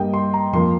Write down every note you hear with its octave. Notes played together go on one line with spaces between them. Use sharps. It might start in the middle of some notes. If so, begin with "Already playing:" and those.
Already playing: G2 G3 A#3 D#5 G5
C6
A#5
F2 F3 A#3 C6